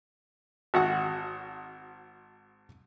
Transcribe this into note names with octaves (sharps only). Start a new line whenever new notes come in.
G#1 F#4 F#5